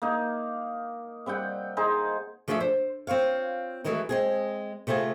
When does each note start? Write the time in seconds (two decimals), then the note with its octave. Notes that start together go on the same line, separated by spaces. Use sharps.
0.02 A#3 D#4
1.26 C3 G3 F#5 G5
1.77 D#4 G#4 C5
2.48 F3 A3 D4 G#4 A4 E5
2.60 C5
3.07 C4 F4 C#5 F5
3.84 D#3 E3 F#3 G#3 A3
4.09 G#3 C4 G#4
4.87 C3 A3 C4 F4 G#4